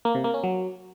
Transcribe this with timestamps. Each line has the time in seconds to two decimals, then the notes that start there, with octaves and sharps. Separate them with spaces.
0.05 A#3
0.15 C3
0.24 A#3
0.34 C#4
0.44 F#3